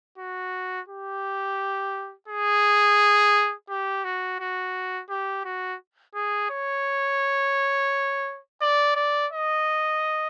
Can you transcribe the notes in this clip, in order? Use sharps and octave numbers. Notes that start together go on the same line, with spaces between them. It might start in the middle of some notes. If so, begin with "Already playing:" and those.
F#4
G4
G#4
G4
F#4
F#4
G4
F#4
G#4
C#5
D5
D5
D#5